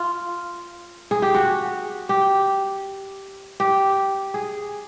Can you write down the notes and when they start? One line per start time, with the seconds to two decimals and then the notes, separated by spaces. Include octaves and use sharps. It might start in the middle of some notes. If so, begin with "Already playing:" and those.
Already playing: F4
1.11 G#4
1.22 G4
1.34 F#4
2.09 G4
3.60 G4
4.34 G#4